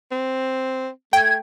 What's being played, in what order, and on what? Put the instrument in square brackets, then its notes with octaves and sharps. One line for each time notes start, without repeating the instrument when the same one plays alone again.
[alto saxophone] C4
[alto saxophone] A3 [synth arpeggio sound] G5 [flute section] G#6